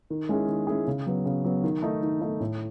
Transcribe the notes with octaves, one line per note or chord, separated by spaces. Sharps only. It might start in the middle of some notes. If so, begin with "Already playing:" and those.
D#3
G#3 C#4 E4 G#4
D#3
G#3 C#4 E4 G#4
C#3
F#3 B3
C#3
F#3 B3
D#3
A3 D#4
D#3
A3 D#4
A2